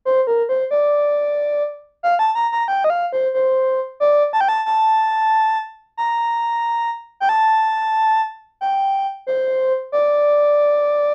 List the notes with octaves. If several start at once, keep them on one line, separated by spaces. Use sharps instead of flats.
C5
A#4
C5
D5
F5
A5
A#5
A#5
G5
D#5
F5
C5
C5
D5
A5
G5
A5
A5
A#5
G5
A5
G5
C5
D5